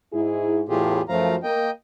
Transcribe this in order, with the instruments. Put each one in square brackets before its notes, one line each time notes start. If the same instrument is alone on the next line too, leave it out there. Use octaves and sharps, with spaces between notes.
[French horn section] G#2 E4 G#4
[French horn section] E2 A2 [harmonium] F4 G4 G#4
[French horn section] F#2 F3 [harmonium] A3 F5 A#5
[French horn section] A#3 [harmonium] D#5 G5